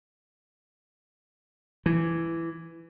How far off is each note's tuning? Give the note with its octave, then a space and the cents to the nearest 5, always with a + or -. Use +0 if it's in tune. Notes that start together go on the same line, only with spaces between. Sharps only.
E3 +10